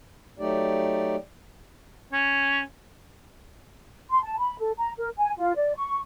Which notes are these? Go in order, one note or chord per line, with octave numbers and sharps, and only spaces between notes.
F#3 A3 D#4 G4 D5
C#4
C6
A5
B5
A4
A#5
A#4
G#5
F4
D5
C#6